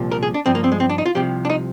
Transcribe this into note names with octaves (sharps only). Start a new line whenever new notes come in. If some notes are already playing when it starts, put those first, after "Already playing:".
Already playing: C2 A#2 F3
A#4
G#4
D4
G2 F3 C4
A#3
C4
G#3
C4
D4
D#4
F4
C2 C3 F3 G4
D4
D#4